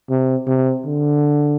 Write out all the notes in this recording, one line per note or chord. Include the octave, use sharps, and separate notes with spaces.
C3
C3
D3